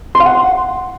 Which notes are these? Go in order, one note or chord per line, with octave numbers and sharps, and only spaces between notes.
C6
F5
F#5